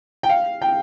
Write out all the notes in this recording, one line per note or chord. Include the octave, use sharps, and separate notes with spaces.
G5
F5
G5